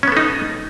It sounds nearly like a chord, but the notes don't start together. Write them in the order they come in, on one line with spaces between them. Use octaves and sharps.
C#4 B3 A4 D#4